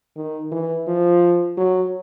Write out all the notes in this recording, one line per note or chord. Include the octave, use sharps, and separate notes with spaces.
D#3
E3
F3
F#3